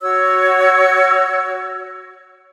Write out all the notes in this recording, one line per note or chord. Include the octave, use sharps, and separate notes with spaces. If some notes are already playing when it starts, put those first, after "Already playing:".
F#4 C#5 E6